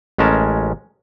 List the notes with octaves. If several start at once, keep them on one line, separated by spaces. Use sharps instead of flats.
A1 G#3 C#4 A#4 A5